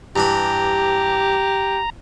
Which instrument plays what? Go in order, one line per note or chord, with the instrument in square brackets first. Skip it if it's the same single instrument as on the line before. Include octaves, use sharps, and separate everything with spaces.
[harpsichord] G2 E3 B5 [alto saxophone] G4 [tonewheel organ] A#5